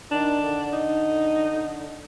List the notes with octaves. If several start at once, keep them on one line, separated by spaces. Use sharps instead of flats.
D#3 D4
D3
D#4